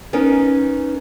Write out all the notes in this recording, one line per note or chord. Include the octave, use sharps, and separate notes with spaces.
B3 C#4 D#4 A#4